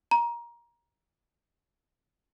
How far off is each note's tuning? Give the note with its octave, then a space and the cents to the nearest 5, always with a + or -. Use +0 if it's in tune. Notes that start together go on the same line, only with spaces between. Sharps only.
A#5 +20